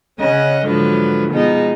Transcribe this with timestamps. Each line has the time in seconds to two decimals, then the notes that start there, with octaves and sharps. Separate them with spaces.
0.19 C#3 C#4 D#5 F#5
0.65 G#2 D3 F3 F#3 B4
1.31 B2 F3 G#3 B3 D#4